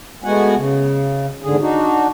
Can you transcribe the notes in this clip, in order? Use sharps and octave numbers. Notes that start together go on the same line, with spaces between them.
G#3 A3 B3 F#4 F#5 G#5
C#3
E2 G#2 D3 G#4
D4 D#4 F#4